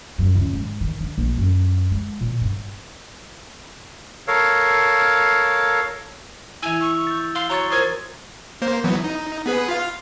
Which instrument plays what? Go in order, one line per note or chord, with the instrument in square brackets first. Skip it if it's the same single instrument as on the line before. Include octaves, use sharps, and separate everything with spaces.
[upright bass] F#2
C#2
G#2
D#3
D3
A#1
F#2
G#3
A#2
G2
[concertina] A4 A#4 C#5 F5
[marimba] E3 E4 [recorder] G#5 [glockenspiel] E6 F7
[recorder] C#6 [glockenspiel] E6
[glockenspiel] G6 A6
[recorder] F5 [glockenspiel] C6 C7 G7
[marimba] F#4 [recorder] C#5 [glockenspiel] A#5 C#6 A6
[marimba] F4 A#4 C5 [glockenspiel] D#6 [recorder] G#6
[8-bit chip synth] A#3 C5
E3 F#3 B3
D#4
B3 G#4 B4
F4 F5